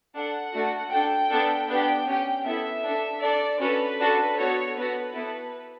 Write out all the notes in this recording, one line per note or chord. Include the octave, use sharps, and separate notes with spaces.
D4 A4 F#5
A3 D4 F#4
D4 A4 G5
B3 D4 A4
B3 D4 G4 G5
C#4 G4 G5
B3 E4 A4 E5
D4 A4
D4 A4 D5
C#4 F#4 A4 B4
D4 F#4 A4
B3 F#4 A4 C#5
B3 F#4 A4 B4
B3 E4 A4